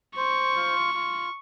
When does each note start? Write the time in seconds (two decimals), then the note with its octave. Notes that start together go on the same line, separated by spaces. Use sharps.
0.16 C5 C#6
0.56 F4
0.94 F4